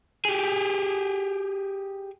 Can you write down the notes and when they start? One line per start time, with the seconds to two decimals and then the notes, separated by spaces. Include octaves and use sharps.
0.25 G4 G#4